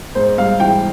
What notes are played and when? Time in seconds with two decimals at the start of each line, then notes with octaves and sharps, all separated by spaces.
0.15 G#2 C5
0.38 G3 F5
0.60 E3 G5